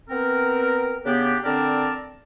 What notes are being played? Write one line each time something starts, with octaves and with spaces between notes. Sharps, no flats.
B3 C4 A#4
C#3 B3 D4 G4
D3 C4 A#4 D5 A5